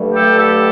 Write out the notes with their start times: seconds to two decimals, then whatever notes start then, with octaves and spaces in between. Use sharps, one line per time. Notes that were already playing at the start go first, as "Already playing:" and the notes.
Already playing: G2 D3 F#3 A3
0.14 G4 A4
0.38 G4 A4